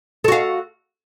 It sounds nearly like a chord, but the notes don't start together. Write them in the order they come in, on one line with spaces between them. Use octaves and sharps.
A4 F#4 F5